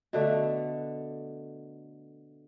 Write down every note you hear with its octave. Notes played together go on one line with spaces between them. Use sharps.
B2 D3 A3